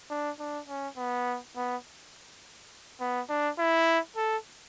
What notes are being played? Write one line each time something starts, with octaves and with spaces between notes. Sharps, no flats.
D4
D4
C#4
B3
B3
B3
D4
E4
A4